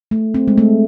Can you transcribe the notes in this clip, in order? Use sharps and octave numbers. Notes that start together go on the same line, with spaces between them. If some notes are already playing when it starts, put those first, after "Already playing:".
A3
C4
G#3
A3